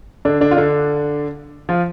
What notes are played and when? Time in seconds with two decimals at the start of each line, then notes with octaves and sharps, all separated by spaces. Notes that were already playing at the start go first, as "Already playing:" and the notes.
0.25 D3 D4
0.41 D3 D4
0.51 F4
0.57 D3 D4
1.69 F3 F4